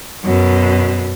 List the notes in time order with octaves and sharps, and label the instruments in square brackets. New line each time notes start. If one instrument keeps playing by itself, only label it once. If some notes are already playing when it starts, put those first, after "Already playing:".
[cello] F#2 B2